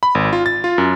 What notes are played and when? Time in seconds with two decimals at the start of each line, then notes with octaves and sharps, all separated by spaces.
0.03 B5
0.15 G#1
0.33 F4
0.46 A6
0.64 F4
0.78 F#2